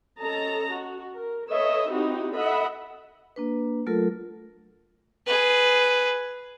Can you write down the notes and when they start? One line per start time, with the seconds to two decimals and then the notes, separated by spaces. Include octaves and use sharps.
0.20 C#4 A4 D#5 A5 A#5
0.71 F#4
1.14 A#4
1.49 A4 B4 C#5 D#5 E5
1.89 C4 D#4 E4 F#4 G4
2.34 A4 D#5 E5 F#5 B5
3.36 A#3 D4 B4
3.86 F#3 A3 F4 A4 A#4
5.26 G#4 B4